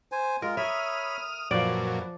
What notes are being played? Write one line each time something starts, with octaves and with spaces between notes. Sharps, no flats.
C5 G#5
G#3 F4 A#4
C#5 E5 B5 D#6 F6
F#2 A#2 F3 F#3 B4 D5